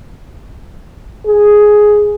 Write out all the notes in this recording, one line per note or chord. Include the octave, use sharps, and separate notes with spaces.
G#4